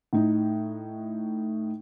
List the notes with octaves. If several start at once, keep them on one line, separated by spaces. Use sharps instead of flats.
A2 D#4